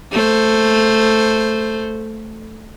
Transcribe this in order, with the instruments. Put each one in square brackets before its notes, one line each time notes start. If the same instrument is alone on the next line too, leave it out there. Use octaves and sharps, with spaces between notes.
[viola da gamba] A3 C5